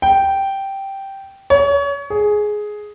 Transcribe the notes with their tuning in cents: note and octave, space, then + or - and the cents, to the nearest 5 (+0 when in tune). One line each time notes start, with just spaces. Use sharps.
G5 -5
C#5 +30
G#4 +10